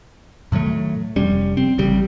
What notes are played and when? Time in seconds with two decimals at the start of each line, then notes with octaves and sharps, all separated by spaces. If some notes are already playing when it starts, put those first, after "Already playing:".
0.52 A2 D#3 F#3 A3
1.16 F1 G3 C#4
1.57 C4
1.78 A1 C#3 G3